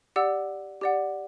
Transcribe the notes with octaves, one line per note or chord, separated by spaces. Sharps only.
G4 D5 F#5 E6
G4 D5 F#5